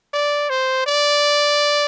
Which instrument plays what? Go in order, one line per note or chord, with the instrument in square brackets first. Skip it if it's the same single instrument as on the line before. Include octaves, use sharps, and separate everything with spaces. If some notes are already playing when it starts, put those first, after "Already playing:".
[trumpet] D5
C5
D5